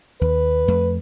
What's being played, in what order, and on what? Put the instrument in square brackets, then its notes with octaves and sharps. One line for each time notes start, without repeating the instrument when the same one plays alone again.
[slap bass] D#2 [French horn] B4
[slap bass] F2 A3